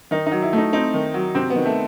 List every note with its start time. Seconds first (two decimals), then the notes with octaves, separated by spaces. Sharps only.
0.11 D#3 D#4
0.27 D#4
0.32 F#3
0.42 E4
0.53 A3 D#4
0.73 C4 D#4
0.94 D#3
1.14 F#3
1.35 C3 C4
1.50 B3
1.56 D#3
1.66 A3